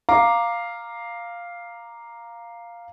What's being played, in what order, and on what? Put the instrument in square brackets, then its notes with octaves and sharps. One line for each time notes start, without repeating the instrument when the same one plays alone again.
[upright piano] F5 A#5 D6